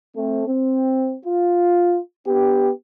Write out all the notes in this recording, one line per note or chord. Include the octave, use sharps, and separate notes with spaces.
A3 C4
C4
F4
B3 D4 G4